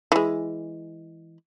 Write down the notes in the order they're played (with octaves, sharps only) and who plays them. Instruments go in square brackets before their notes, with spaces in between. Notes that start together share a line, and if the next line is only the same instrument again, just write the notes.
[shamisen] E3 G#3